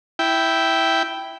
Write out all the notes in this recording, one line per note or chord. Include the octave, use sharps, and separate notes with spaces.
E4 G5